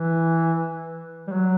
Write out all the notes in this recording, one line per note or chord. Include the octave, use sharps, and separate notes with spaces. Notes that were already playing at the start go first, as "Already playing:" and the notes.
Already playing: E3
G3
F#3